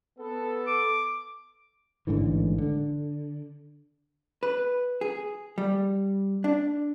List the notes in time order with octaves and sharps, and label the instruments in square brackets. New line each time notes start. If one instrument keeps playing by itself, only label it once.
[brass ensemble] B3 A4
[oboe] D6
[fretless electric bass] A1 G#2 D3 E3
D3
[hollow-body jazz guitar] B4
G#4
G3
D4